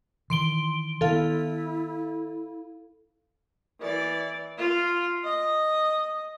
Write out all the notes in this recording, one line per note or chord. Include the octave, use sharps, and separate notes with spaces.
D#3 E3 C6 D7 G7
D#3 B3 E4 A4 F5
E3 D5
F4
D#5